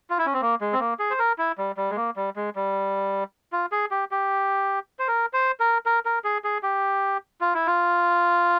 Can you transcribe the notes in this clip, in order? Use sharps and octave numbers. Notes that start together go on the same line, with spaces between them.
F4
E4
C#4
C4
A#3
G#3
C4
A#3
G#4
C5
A#4
E4
G3
G3
G#3
A#3
G3
G#3
G3
F4
G#4
G4
G4
C5
A#4
C5
A#4
A#4
A#4
G#4
G#4
G4
F4
E4
F4